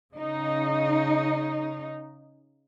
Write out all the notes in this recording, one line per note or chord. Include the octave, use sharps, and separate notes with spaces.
C#3 D#4